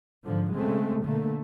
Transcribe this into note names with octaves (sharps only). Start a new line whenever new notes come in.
G#2 D3 F3
C#3 G#3 A3 C4
B2 D3 A3 A#3